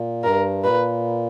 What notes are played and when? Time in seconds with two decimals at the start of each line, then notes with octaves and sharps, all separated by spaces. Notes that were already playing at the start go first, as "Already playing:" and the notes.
Already playing: A#2
0.24 G2 A#4
0.64 A#2 B4